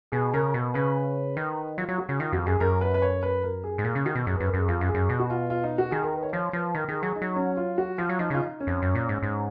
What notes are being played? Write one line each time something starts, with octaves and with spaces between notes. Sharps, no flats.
B2 G#4
C#3 A#4
B2
C#3 B4
D#3
F#3 F4
F#3
F#4
C#3
D#3 F4
F2 F#4
F#2 G#4
F#2 A#4
B4
B4
C#5
B4
A#4
G#4
G#2
A#2 G#4
C#3
D#3 F#4
B2
F#2 G#4
F#2 B4
A#4
F#2 G#4
F2 F4
F#2
G#4
F#2
B2
F#4
F4
F4
D#4
F#4
D#3 G#4
A#4
B4
C#5
F3 C#5
F3 B4
D#3 A#4
D#3 G#4
F#3 G#4
D#4
F#3
C#4
F4
F#4
F3 F4
F#3
F3 D#4
C#3 F4
D#4
C#4
F2
F#2
A#2
G#2
G#2